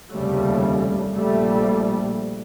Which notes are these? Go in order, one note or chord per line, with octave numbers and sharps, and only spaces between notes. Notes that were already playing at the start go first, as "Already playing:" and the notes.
F1 D#2 C#3 G3 A3
A#1 A#2 G3 A3